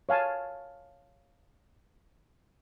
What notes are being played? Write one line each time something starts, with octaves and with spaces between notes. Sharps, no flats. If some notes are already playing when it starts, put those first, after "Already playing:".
C#5 F5 G#5 A5